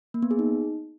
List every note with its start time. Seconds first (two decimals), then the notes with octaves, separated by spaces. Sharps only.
0.14 A#3
0.22 B3
0.31 G#4
0.39 D#4